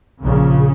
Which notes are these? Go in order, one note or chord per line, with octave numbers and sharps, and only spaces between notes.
A#1 A#2 C#3